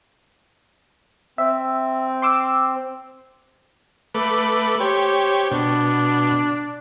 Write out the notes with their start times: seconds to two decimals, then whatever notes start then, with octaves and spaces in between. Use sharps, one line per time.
1.38 C4 E5
2.22 C6 D6 E6
4.15 A3 B4 D6
4.80 G4 C5 C#5
5.51 B2 D4